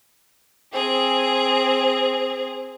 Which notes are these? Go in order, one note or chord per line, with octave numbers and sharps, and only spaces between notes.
C4 G#4